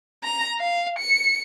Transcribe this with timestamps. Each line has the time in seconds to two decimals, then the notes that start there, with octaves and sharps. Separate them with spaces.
0.24 A#5
0.59 F5
0.99 C#7